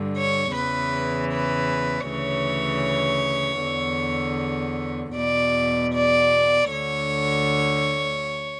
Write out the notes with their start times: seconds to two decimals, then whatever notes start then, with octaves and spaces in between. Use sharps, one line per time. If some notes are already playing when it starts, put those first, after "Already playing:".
Already playing: G2 D3
0.17 C#5
0.54 E2 C#3 E3 B4
1.32 B4
2.09 D2 C#3 E3 C#5
3.63 E2 D3
5.16 E2 B2 D5
5.94 D5
6.71 D2 D3 C#5